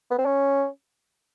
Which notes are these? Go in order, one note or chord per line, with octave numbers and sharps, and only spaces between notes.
B3
C4
C#4